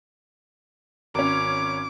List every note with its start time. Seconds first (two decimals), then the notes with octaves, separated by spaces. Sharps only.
1.15 G#1 C#4 D6